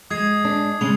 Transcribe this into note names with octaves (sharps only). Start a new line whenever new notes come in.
G#3 D#6 G#6 C7
D4
C#3 G#3 F7